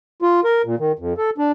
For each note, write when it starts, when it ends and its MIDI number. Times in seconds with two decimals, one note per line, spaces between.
0.22 0.40 65
0.44 0.62 70
0.65 0.75 46
0.79 0.92 51
0.99 1.14 41
1.18 1.30 69
1.38 1.52 62